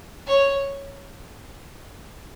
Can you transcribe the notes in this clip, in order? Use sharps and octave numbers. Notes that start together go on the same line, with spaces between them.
C#5